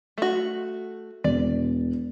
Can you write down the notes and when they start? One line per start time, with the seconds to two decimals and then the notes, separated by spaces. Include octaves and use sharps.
0.18 A3 F#4
1.24 E1 D5